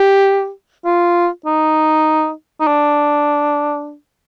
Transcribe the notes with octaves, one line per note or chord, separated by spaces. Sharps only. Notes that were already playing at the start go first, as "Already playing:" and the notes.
Already playing: G4
F4
D#4
D#4
D4